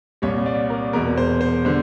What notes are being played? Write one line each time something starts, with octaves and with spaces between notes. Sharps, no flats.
C2 A#2 G3 C#5
D5
A#4
E2 B2 G#3 A#4
C5
C5
D3 G3 C5